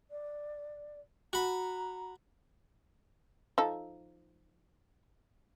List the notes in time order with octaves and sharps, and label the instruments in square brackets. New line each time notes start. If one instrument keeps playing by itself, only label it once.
[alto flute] D5
[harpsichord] F#4 B5 [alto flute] A#5
[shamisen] F3 D#4 A4